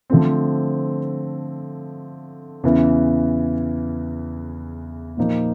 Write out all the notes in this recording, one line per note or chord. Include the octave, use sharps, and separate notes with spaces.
D3 F3 A3 C4
E2 C#3 E3
A#2 F3 A#3 D#4